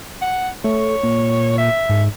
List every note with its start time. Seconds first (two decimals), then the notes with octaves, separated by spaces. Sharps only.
0.21 F#5
0.64 A3 C#5
1.03 A#2
1.58 E5
1.89 G#2